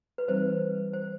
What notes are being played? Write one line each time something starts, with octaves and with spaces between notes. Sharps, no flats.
B4
E3 G3 C4 D#4 C5
C5